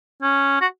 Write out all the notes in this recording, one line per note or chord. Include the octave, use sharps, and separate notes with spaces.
C#4
F#4